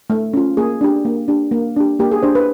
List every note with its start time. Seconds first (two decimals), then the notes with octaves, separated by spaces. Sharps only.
0.10 A3
0.34 C#4 F4
0.57 A#3 G#4
0.81 D4 G4
1.05 A#3
1.28 D4 G4
1.52 A#3
1.76 D4 G4
1.99 A#3 G4
2.12 G#4
2.23 D4 G4 C5
2.35 B4